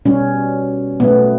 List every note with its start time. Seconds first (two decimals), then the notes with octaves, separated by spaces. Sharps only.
0.05 B2 G3 C#4
1.00 B2 F#3 A3 B3